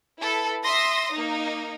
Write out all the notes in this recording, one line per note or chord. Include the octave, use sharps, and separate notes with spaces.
E4 A4 B4
E5 C6 D#6 A#6
A#3 D#4